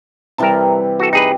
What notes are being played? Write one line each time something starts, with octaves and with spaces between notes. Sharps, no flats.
C3 E3 G3 A#4 A5
F#4 A4
D#4 G4 G#4 B4 A5